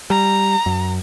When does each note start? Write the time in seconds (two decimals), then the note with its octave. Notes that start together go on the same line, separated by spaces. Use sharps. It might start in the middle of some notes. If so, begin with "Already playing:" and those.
0.10 G3 A#5
0.66 F#2